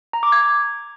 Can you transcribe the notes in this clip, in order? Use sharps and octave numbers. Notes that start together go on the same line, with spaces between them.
A#5
D6
G#6